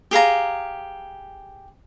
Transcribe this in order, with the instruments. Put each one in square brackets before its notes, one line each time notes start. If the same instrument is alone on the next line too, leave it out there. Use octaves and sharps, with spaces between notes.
[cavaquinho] G4 G#4 F5 A#5